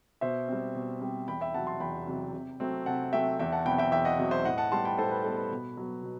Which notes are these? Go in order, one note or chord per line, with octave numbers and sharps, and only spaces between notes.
B2 C5 E5
G3 C4
B2
G3 C4
E2 G5 B5
E5 G5
C3 F#3 F#5 A5
A5 C6
E2 G5 B5
C3 F#3
C3
F#3 A3 C4
C3 F#5 A5
F#3 A3 C4 E5 G5
E2 E5 G5
F#5 A5
B2 F#3 C4 G5 B5
E5 G5
E2 E5 G5
D#5 F#5
B2 F#3 C4
C5 E5
A2 D#5 F#5
F#5 A5
G3 B3 A5 C6
G5 B5
A2 A4 C5
B4
G3 B3 A4
B4
B2
F#3 B3
B2